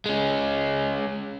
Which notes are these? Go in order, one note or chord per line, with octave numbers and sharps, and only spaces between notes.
G#3 C#4